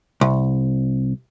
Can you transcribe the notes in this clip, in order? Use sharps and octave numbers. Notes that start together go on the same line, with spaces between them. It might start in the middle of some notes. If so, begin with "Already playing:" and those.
C2